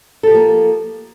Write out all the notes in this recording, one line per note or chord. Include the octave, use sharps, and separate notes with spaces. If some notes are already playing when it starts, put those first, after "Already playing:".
F3 A#3 G4 A4